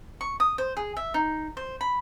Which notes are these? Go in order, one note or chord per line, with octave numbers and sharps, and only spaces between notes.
C#6
D#6
C5
G#4
E5
D#4
C5
B5